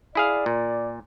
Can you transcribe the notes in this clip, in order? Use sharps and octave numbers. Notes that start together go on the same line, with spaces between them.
E4 G#4 D5 F5
A#2